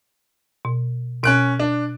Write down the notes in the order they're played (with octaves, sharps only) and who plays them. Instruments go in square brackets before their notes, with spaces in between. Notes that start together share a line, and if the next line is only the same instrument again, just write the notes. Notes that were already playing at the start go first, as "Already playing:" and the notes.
[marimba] B2
[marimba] B2 [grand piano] C#4 F#6 D7
[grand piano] D4